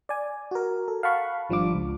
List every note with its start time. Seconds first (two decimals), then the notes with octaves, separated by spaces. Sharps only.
0.09 D5 G#5
0.51 F#4 A#4
0.88 A4
1.03 F5 F#5 A5 B5 C#6
1.50 G#1 F3 G3 D4 F4 D6
1.74 C#2